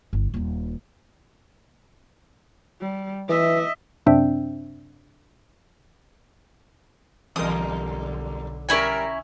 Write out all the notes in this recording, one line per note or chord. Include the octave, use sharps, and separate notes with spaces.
G1
D#1 D#4
G3
E3 D#5 E5
F#2 C3 C4 D4 E5 G5
B1 E2 D3 G3 A#4 D#6
G3 C#4 E4 A#4 G#5